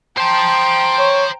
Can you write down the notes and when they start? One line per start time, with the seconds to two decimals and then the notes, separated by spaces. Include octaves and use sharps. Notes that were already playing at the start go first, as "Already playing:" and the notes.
0.18 C5 G5 A5 A#5 C6
0.99 C#5